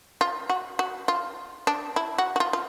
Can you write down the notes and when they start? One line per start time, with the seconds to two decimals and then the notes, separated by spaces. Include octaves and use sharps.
0.21 F4
0.50 F#4
0.79 F#4
1.08 F4
1.67 D4
1.96 E4
2.18 F#4
2.36 F#4
2.40 F4
2.53 F4